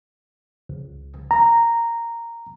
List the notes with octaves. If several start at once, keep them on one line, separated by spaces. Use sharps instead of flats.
C#2
A#5